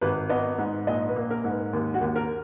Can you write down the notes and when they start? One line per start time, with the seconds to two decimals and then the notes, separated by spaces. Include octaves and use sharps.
0.01 G#1 B4
0.29 B3 D#5
0.58 G#2 B4
0.87 A#1 D#5
1.09 B4
1.16 A#3
1.30 A#4
1.44 G#2
1.51 B4
1.73 D#2
1.94 F#4
2.01 D#2
2.16 A#4